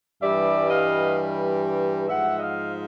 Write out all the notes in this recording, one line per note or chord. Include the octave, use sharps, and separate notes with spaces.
G2 E3 G3 D5 E5
D#5 F5
G#2 F3 E5 F#5
D#5 F5